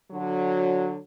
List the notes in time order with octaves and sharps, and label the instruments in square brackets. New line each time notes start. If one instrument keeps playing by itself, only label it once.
[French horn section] D3 F#3